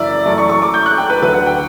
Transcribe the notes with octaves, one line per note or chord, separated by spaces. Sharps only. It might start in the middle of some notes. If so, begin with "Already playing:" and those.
Already playing: F#1 F#2 E3 D5 E5
F#2 E3 A3 D5
C#6
C#6
D6
G6
F#6
G5
B4
D2 D3 F#3 B4
F#5
G5